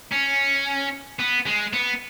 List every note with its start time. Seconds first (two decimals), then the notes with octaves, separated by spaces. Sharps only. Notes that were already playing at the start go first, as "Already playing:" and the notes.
0.12 C#4
1.19 B3
1.46 G#3
1.73 B3